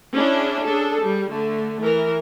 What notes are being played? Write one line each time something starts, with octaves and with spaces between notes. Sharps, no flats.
C#4 D4 E4 G#4
D4 G#4 A4
G3
D3 A3
E3 A#4